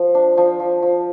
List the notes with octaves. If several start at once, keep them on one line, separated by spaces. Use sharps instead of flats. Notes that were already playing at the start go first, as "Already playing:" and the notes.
Already playing: F3
D4
F3
F3
F3